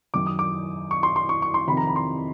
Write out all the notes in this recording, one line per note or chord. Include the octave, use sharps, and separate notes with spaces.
F#2 D#3 D6
D#6
D6
C#6
C6
C6
C#6
C#6
C6
F2 C3 D#3 B5
A#5
B5
C6